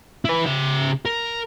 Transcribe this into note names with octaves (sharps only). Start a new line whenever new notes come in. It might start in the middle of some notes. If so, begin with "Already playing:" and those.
E4 B4
C#3 E5
A#4